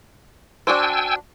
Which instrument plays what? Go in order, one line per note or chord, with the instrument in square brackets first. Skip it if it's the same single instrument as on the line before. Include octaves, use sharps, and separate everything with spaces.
[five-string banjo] D4 F#4 C5 [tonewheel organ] G5 G#5 E6